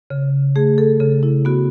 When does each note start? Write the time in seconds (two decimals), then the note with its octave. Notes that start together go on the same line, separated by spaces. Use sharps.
0.10 C#3
0.56 A3 G#4
0.78 A4
1.00 C#3 A4
1.23 E4
1.45 B3 F#4